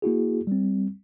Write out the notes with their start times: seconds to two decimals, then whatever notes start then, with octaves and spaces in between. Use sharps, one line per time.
0.02 A#3 E4 F#4 G#4
0.47 G3 C4